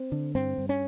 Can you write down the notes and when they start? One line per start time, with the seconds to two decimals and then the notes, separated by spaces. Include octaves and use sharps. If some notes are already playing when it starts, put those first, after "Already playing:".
Already playing: C4
0.12 D3
0.35 G2 C4
0.58 G2
0.69 C#4